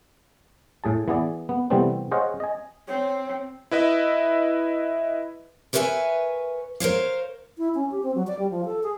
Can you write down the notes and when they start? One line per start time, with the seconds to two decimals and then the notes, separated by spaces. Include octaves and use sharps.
0.84 A2 G#4 A5
1.08 E3 B3 G#4 D5
1.49 B3
1.70 C3 E3 G3 A3 B3 C4
2.11 G#4 C5 C#5 D#5 F5 F#5
2.40 D#5 G#5
2.88 C4 C#5
3.71 E4 B4 D#5 E5
5.73 A#4 B4 C#5 D#5 E5 G#5
6.80 A#4 C5 C#5 F5
7.58 E4
7.75 C#4
7.91 G4
8.03 C4
8.15 F#3
8.27 D5
8.39 G3
8.51 F3
8.65 A4
8.83 G#4